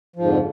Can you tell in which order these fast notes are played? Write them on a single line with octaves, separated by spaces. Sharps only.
F3 G#2 F2 D3